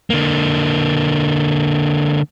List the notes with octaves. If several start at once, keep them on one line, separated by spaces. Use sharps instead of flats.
D3 A#3